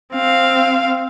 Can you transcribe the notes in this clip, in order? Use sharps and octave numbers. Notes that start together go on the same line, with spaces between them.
C4 F5